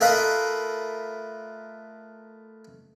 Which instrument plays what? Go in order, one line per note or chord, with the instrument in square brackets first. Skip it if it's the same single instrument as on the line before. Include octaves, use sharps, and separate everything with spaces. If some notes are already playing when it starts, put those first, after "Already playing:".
[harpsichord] A3 F4 A#4 B4 D#5 F5